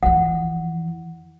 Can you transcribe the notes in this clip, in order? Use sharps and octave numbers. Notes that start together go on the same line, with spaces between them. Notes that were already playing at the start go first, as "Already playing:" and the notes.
F2 E3 F#5